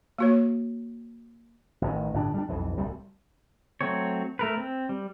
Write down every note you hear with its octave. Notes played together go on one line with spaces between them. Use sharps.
A#3 F#4 C#5
A1 A2 D#3
G1 A2 D4
G3 D4
B1 F2 E3
D1 C2 G3
F#3 A3 C4 C#5
A3 A#4 B4
C4
G3